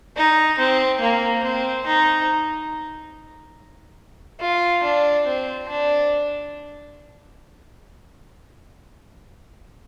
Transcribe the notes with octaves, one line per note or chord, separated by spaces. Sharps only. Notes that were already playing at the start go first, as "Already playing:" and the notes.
D#4
C4
A#3
C4
D#4
F4
D4
C4
D4